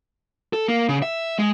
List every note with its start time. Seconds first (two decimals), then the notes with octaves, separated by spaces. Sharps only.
0.53 A4
0.68 A#3
0.89 C#3
1.02 E5
1.39 G#3